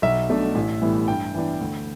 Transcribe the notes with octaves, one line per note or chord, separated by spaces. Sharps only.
B1 E5
B2 A3 D4
A1
A2 E3 G3 B3
G2 G5
E3 B3 D4
D2